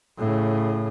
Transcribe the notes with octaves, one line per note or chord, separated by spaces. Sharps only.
A2 C#3